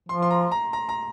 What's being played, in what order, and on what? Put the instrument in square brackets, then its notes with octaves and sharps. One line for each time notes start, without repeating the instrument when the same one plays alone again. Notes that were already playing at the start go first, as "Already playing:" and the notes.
[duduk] F3 [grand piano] C6
[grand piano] C6
A#5
A#5
A#5
A#5